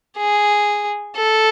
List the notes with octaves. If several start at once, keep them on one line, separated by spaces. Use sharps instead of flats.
G#4
A4